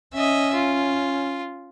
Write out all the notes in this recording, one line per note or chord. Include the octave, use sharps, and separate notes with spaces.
C#4 D#5 E5
F4